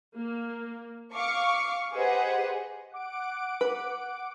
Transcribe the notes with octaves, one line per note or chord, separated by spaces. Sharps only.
A#3
F5 C#6 D6
G4 G#4 B4 C5 D#5 F#5
F#5 D6 D7
B4